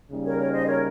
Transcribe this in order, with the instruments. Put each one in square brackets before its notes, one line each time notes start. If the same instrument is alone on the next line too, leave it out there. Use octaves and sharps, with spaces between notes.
[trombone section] C#3 G3 A#3 D#4
[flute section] A#4 C#5
A#4 C#5
C5 D#5
A#4 C#5